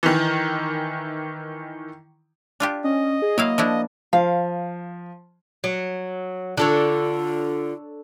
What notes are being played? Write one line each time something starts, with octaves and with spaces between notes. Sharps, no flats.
D#3 E3
D4 F4 G4
C#4 D#5
G#4
F#3 A#3 E4 F5
F3 D4 E4
F3 F5
F#3
D3 D4 F4 A4 C#5